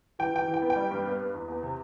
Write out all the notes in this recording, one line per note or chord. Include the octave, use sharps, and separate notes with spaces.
E3 G5
E3 G5
E3
G5
B3
G5
G3
G2
B3
B3
E2
E2
C3